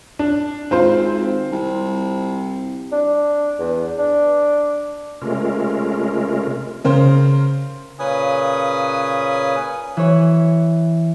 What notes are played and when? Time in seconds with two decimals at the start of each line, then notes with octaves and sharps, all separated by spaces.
0.19 D4
0.71 G#1 C4 F4 C5
1.52 C2
2.92 D4
3.59 E2
3.98 D4
5.22 C3 G#3 A3 C#4 F4 A#4
6.84 C#3 A#4 C5 C6
7.99 A#2 C#3 C#4 B4 G#5 D#6
9.97 E3 C#5